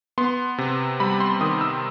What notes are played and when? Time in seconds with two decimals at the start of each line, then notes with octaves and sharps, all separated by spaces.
0.18 B3 C6
0.58 C3
1.00 G3 B5
1.20 C6
1.41 D#3 D#6
1.61 E6